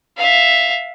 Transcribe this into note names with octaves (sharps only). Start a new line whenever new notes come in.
E5 F5